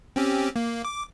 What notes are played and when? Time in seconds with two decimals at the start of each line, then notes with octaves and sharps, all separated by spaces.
0.16 C4 C#4 G4
0.56 A#3
0.85 D6